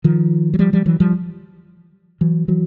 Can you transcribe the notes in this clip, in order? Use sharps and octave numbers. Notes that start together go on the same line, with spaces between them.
D#3 F3
F#3
F3 G3
F3 G3
E3 F#3
F3 G3
E3 F#3
E3 F#3